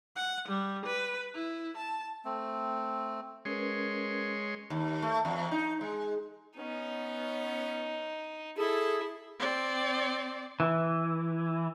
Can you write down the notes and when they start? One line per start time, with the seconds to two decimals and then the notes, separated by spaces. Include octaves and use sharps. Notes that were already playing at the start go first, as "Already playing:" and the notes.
0.16 F#5
0.49 G3
0.86 B4
1.34 E4
1.77 A5
2.25 A3 C4
3.45 G#3 C#4 A#4 B4 C#5 C6
4.70 D#2
5.02 A3
5.25 E2
5.51 D#4
5.81 G#3
6.57 B3 C#4 D#4
8.57 E4 G#4 A4
9.39 C4 D5
10.60 E3